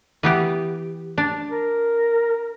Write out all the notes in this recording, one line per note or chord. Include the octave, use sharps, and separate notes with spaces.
E3 B3 G4
D4
A#4